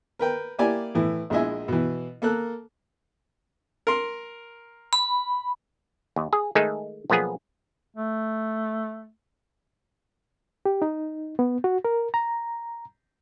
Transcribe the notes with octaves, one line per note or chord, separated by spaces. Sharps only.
A#4 B4 G5
A#3 E4 G4 D5 G#5
A2 E3
A#1 G#3 E4 D#5 E5 G#5
B2 E3
A#3 A4 A#4 F#6
A#4 C6
B5
D#2
G#4
D#3 G#3 A3 D#4 G#4
B1 F3 A#3 B3 G#4
A3
G4
D#4
B3
F#4
A#4
A#5